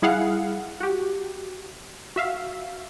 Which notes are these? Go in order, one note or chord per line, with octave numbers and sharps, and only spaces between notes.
G3 E4 G#4 F5 F#5
F#4 G4
F#4 E5 F5